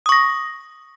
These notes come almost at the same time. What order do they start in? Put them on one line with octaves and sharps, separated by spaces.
D#6 C#6 A#6